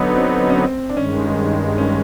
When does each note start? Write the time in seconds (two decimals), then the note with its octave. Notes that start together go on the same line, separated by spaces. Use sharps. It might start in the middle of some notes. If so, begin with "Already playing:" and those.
Already playing: D3 F#3 B3 D#4
0.16 C4
0.50 C#4
0.57 C4
0.90 D4
0.97 G2 D#3 G#3 C#4
1.78 C#4